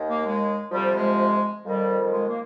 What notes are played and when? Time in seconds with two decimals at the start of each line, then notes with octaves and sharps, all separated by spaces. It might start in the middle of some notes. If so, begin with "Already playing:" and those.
Already playing: D#2 D#3
0.09 A#3
0.25 G#3
0.72 D2 C3 F3 G3
0.95 G#3
1.65 F2 D#3 G3
2.12 G#3
2.28 A#3